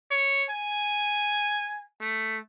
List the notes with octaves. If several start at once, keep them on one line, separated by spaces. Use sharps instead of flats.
C#5
G#5
A3